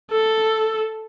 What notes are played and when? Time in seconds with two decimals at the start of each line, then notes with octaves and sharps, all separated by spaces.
0.11 A4